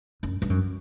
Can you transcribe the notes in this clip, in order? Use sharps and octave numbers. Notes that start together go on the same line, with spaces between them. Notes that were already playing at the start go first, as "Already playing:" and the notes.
F#2
G2
F#2